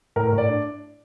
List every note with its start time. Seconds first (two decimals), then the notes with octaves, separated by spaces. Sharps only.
0.16 A2 A#4
0.27 A#4
0.33 A2
0.38 D5
0.49 D4